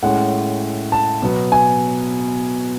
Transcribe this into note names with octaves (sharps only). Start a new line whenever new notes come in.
A2 G#3 C#4 F#5
A5
B2 F#3 B3
G#5